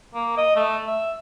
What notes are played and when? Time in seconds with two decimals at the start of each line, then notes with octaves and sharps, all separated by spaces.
0.15 A#3
0.37 D#5
0.56 A3
0.87 E5